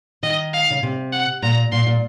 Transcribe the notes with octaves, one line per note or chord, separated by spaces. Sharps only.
D#3 D#5
F5
C#3
C3
F#5
A#2 A#5
A#2 C6
A#2